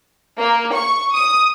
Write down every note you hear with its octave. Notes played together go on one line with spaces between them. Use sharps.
A#3
C#6
D#6